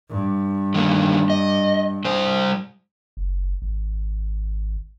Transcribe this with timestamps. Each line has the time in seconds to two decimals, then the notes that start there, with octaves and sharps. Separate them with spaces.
0.11 G2
0.75 D3 D#3 A#3
1.30 D#5
2.05 G3 C5
3.17 F#1
3.62 G#1